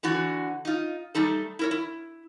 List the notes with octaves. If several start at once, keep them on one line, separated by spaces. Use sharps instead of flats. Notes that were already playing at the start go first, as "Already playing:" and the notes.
D3 E3 D4 F#4
D#4 F4
G3 A3 D#4 A4
E4 A#4 C#5
E4